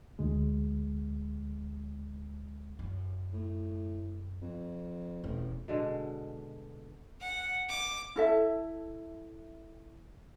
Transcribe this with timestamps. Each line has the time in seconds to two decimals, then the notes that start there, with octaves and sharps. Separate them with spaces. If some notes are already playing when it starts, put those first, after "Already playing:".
0.19 D2 G#3
2.79 F#2
3.33 A2
4.41 F2
5.24 E1 A1 E2
5.68 B2 D3 G#3
7.21 F#5
7.69 D6
8.16 E4 A4 E5